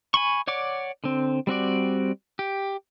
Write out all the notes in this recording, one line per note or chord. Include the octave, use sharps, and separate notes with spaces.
G#5 B5 C#6
C#5 D5 F#5 D6
D3 C4
G3 C4 F#4 D5
G4